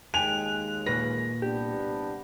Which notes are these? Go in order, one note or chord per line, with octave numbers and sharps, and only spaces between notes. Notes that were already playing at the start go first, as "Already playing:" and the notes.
D#2 G#3 G5 G#5 F#6 F7
A#2 A#3 B4 A#6
C2 B3 D4 G4